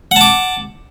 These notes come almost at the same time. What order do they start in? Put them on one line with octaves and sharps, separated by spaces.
F#5 A5 D6